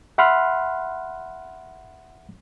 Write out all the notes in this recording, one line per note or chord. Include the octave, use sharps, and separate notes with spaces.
E5 F#5 B5 C6 F6 F#6